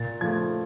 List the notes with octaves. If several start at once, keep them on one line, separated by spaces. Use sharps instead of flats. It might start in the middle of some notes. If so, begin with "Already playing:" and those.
Already playing: A#2 A6
F3 A3 G#6